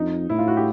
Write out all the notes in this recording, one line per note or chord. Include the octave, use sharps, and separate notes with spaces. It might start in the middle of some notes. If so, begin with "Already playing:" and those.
Already playing: F2 D#4
A2 E4
F4
F#4
G4